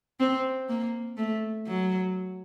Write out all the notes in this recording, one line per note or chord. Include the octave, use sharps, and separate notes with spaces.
C4
A#3
A3
F#3